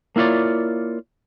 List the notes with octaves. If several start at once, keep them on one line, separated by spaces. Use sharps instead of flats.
A#3 E4 F4 C#5 D5